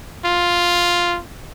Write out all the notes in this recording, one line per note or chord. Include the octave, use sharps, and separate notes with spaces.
F4